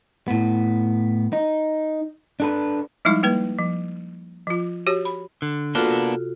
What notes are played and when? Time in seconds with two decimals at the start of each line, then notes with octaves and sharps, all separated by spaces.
0.28 A2 B3
1.33 D#4
2.40 D4 A4 B4
3.05 F3 G3 G#3 D#4 E4
3.23 G3 A#3 B4
3.58 F3
4.47 F3 F4
4.87 F#4 G4 C#5
5.05 B5
5.42 D3
5.75 A#3 B3 D4 F4 F#4 A4
5.87 C3